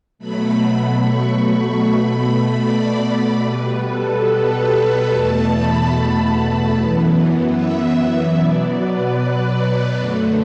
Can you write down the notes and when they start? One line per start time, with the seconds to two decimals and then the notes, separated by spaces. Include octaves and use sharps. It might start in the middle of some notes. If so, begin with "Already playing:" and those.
0.19 B2 F#3 A3 B5
1.00 C#6
1.81 B2 A3 B5
2.63 D5
3.45 B2 G3 B3 B4
3.85 A4
4.26 B4
4.68 B4
5.08 E2 B2 A3 A5
5.50 B5
5.90 A5
6.72 F#2 E3 B3
7.53 E5
8.34 B2 F#3 B3 D5
8.76 B4
9.98 F#2 D3 A3